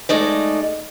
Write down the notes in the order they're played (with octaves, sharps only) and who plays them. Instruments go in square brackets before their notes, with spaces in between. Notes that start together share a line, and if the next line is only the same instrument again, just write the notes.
[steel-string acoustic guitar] G#3 A3 D#4 D5